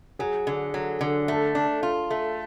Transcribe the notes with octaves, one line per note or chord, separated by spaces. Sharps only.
F#3 G#4
D3
F#3
D3
A3 A4
D4
F4
A3